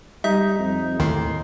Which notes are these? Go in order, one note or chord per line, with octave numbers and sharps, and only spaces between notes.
G3 D#4 E5
F2
D#2 A2 D#3 C6